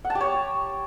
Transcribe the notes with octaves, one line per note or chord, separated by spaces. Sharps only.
F#5
A5
G4
C#5